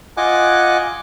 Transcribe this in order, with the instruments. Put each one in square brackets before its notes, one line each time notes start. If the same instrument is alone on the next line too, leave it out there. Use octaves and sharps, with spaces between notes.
[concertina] F4 D#5 F#5 G#5 D6 F#6